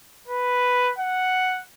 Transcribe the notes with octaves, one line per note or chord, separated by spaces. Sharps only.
B4
F#5